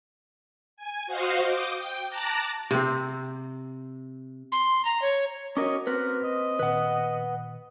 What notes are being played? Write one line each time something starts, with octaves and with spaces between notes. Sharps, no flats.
G#5
F#4 C5 D#5 F5
D6 D#6 G6
G5
A5 A#5 D6 F#6 A#6
C3 C4
C6
A#5
C#5
C#4 F#4 A#4 C#5 D#5 D6
C4 A#4 B4
D#5
A#2 D#3 B4 F#5